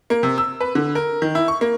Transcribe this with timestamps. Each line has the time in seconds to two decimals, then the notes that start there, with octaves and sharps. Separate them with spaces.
0.10 A#3
0.23 C3
0.38 E6
0.61 B4
0.75 D3
0.95 A#4
1.22 D#3
1.35 E4
1.48 C#6
1.61 A#3